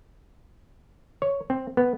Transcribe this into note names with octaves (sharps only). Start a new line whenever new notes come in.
C#5
C4
B3